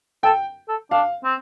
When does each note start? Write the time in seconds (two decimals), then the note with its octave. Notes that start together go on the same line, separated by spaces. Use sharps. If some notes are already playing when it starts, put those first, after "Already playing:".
0.23 A4 G5
0.69 A4
0.91 D4 F5
1.24 C4